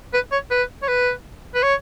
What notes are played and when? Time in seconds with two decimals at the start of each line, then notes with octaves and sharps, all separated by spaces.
0.14 B4
0.32 C#5
0.51 B4
0.83 C#5
0.88 B4
1.55 B4
1.63 C#5